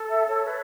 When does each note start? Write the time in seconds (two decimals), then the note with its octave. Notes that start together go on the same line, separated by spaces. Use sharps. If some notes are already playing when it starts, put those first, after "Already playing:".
Already playing: A4
0.10 E5
0.28 C#5
0.47 B4